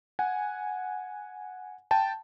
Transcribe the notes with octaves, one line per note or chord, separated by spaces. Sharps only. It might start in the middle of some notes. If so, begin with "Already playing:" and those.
F#5 G#5
G5 A5